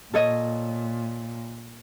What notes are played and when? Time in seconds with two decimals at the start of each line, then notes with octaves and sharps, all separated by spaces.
0.14 A#2 A4 C#5 D#5